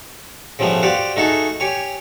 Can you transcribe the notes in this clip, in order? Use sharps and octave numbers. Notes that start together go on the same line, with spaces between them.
C#3 F3 G3 A3 B3
F#4 G4 C5 D5 F5
A3 D#4 F#4 G#4 A4
G4 C#5 G#5